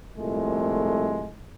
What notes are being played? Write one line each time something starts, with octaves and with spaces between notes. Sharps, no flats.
C2 F2 A#2 G#3 A3